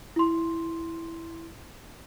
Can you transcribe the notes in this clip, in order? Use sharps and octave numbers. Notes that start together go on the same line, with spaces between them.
E4 C6